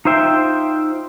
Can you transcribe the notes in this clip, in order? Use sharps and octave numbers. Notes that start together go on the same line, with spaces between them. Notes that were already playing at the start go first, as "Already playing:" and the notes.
D#4 F4 C5 E5 G5